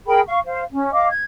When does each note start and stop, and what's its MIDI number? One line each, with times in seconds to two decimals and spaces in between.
0.06 0.19 68
0.06 0.19 70
0.06 0.19 79
0.06 0.19 83
0.27 0.39 77
0.27 0.39 85
0.46 0.62 72
0.46 0.62 77
0.71 0.88 61
0.93 1.08 75
0.93 1.08 77
0.93 1.08 86
1.09 1.24 92